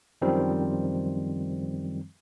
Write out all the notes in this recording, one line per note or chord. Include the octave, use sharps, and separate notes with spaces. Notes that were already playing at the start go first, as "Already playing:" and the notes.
F#2 D#3 F3 G3 C4